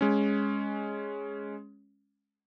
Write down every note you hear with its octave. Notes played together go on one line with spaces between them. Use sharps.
G#3 C#4